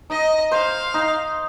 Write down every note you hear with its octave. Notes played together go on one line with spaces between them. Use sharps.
D#4 D#5
C5 F5
D#4